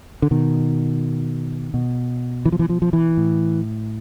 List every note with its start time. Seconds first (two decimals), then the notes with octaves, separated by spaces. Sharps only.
0.22 D3
0.31 B2 D#3
1.74 B2
2.45 E3
2.52 F3
2.59 E3
2.69 F3
2.82 F3
2.93 E3
3.17 A2